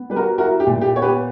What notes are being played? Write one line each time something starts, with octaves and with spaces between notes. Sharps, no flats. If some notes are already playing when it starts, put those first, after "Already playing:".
Already playing: B3
G3 B4
F#4 A#4
E4 F#4 A#4
G4
A#2
G4
B3 C#5
G4 B4